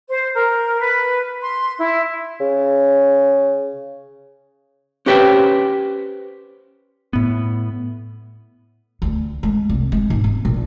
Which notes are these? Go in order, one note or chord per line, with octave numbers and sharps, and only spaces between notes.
C5
A#4
B4
C6
E4
C#3
C#4 G4 B4 C5 G5
A2 B3
D2
G#3
C2
G#3
G#2
B3
A#1